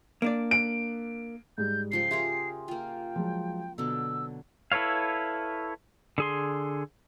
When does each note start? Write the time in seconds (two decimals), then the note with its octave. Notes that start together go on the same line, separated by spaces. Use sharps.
0.22 A#3 D4 D5
0.51 D7
1.58 G#2 G3 G#3 G6
1.92 C#3 F3 G5 C7
2.11 G4 G#4 A#4 E5 C6
2.68 A#3 F4 G5
3.16 F3 F#3 G#3
3.78 B2 D3 F#3 E6
4.72 E4 A4 B4 C#5 F5
6.18 D3 G#4 C6